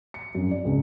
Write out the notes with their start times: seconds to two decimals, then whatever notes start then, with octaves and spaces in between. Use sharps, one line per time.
0.14 C#7
0.35 F#2
0.51 D5
0.65 C#2